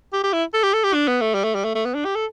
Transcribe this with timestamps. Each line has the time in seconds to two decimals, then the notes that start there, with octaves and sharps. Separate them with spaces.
0.13 G4
0.24 G4
0.33 E4
0.54 A4
0.63 G4
0.74 A4
0.84 G4
0.94 D4
1.08 B3
1.21 A3
1.34 G3
1.44 A3
1.55 G3
1.65 A3
1.75 A3
1.85 B3
1.95 D4
2.05 G4
2.15 A4